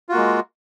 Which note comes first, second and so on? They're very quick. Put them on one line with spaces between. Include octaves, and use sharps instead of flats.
F4 F#4 A#3 G#3